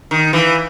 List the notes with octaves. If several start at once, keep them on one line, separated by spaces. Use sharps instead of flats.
D#3
E3